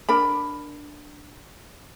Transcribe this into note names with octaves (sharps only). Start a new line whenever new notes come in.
D4 A#4 B5